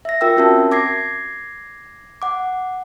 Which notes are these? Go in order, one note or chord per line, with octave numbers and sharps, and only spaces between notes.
E5 A#6
F4 A#4 G5 E6
C4 C#4 F#4 A#4 E5 A5
D6 G#6 A#6 C7
F#5 D6